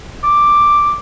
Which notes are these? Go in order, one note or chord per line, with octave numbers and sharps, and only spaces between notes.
D6